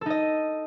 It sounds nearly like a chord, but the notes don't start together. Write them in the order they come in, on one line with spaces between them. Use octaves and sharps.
A4 D#4 D#5